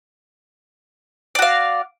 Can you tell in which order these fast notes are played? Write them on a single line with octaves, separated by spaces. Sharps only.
D5 F#4 F5